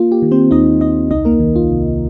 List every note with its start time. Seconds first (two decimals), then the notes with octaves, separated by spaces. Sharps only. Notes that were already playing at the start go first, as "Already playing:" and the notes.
Already playing: A#3 F4
0.12 G4
0.22 D#3
0.31 C4 C5
0.51 D#2 D#4 D#5
0.81 D#2 D#4 D#5
1.11 C2 D#4 D#5
1.25 A#3 A#4
1.40 D#3
1.56 F4
1.70 C3